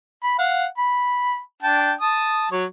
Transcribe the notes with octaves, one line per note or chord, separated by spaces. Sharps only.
B5
F5 F#5
B5
D4 G5 A5
A5 D#6
F#3 C#5